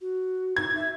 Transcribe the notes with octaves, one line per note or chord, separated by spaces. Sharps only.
F#4
D#4 G#6
E5